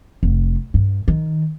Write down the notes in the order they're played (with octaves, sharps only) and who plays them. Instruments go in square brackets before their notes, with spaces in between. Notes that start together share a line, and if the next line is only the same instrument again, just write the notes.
[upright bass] F1
G2
D#3